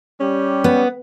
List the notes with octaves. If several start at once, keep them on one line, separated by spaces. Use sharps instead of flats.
G3 C#4 G4
B3